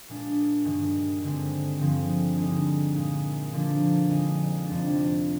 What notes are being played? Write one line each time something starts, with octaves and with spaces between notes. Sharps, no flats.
A#2 G#3 D4
G2 D#3 G#3
G2 D3 G#3 C4
G2 D3 F3 G#3 C4
D3 G#3 D#4
A#2 G#3 D#4
D3 F3 A#3 D4
F2 D3 G#3 D#4
F2 C3 G3 D4